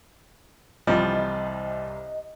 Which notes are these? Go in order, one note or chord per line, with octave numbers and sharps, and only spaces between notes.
C2 C3 E3 F3 G3 D#5